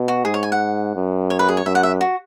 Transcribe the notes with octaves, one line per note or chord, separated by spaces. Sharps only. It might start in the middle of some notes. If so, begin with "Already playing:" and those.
Already playing: B2
F#4
G#2 G#4
C#5
G#5
F#5
F#2
C#5
B4
G#4
C#5
F#2 E5
F#5
E5
F#4